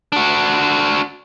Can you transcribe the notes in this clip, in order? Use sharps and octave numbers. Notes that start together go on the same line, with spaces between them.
D4 F#4